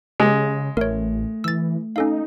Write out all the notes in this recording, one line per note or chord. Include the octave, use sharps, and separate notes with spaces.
C#3 G#3 G4 G#4
A1 A3 A#4 C#5
E3 E6 A6
C#4 D#4 A4 F5